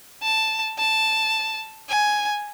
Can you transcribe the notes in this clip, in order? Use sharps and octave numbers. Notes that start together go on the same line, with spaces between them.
A5
A5
G#5